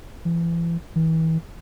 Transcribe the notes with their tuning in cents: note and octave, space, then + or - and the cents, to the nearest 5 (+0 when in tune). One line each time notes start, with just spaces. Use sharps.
E3 +35
E3 -35